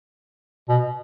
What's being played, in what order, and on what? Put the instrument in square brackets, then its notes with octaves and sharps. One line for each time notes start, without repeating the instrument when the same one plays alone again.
[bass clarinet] B2